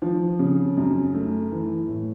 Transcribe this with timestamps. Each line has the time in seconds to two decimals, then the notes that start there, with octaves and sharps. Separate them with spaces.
0.02 F3
0.39 C#3
0.77 F#2
1.14 A3
1.51 E3
1.88 A2